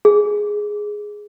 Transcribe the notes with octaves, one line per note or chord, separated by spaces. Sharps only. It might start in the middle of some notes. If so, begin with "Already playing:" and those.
G#4